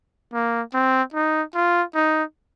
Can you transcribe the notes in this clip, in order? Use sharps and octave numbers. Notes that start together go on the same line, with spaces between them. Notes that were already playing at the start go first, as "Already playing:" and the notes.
A#3
C4
D#4
F4
D#4